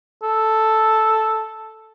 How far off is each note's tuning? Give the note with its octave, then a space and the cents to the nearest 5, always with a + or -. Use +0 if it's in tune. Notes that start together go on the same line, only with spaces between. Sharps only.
A4 +0